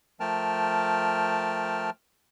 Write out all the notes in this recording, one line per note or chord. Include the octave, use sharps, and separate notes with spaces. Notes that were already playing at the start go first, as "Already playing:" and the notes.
F3 A3 A#4 G5 A5 F6